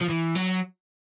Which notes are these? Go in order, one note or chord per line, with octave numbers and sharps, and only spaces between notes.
F3
E3
F#3